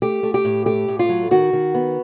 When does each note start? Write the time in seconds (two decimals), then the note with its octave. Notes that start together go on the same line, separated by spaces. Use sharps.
0.02 A3 G4
0.23 A3
0.34 G4
0.45 A2
0.66 A3 G4
0.88 A2
0.99 F4
1.09 F#3
1.31 D#3 F#4
1.53 D#3
1.74 B3